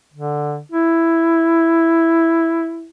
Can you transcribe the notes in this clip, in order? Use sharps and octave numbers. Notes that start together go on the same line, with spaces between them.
D3
E4